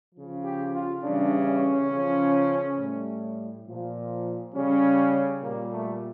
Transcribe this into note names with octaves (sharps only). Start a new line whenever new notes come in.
C#3 F3
G4
F4
C#3 E3 G3 D4
C#4
C#3 F3
A2 G3
A#2 F3
C#3 G3 C#4
A#2 G3 A#3
A3